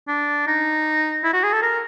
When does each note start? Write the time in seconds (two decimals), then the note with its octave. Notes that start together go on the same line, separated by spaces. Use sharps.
0.08 D4
0.47 D#4
1.24 E4
1.33 F#4
1.44 G#4
1.53 A4
1.62 A#4